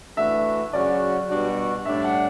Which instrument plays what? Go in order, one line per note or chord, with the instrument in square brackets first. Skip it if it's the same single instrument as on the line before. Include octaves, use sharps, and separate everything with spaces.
[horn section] E3 A3 D4 F#4 [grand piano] E5
[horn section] C#3 F#3 C#4 F#4 [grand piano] D5
[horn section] B2 G3 D4 F#4
[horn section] A2 G3 D4 [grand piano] E5
[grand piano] F#5